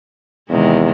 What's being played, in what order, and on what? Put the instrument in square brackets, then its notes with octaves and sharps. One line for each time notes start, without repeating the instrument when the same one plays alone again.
[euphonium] E2 [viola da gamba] C3 D#3 G#3